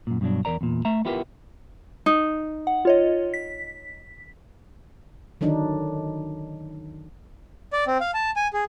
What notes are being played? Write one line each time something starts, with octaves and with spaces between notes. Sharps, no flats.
F#2 A#2
G2 B2 D3 F#3 D4
E2 A#4 D5 A#5
E2 A#2
A3 E5 A#5
B3 E4 F4 G4 A#4 B4
D#4
F#5
F4 C#5 D#5
B6
D3 D#3 F#3 D4 D#4
D5
C4
F5
A5
G#5
G#4